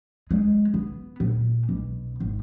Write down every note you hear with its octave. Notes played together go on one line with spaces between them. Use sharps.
G#3
B3
A#2
B1
G#1